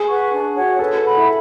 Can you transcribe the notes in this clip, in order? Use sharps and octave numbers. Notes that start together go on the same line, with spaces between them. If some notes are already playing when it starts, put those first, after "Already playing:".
Already playing: G#4
B4 F#5 C#6
D4
F#4 C#5 F#5
A4 B4
F#5 B5
E4